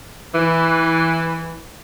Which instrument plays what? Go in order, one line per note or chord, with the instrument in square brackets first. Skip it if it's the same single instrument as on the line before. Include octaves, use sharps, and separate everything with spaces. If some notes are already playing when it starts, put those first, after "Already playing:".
[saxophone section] E3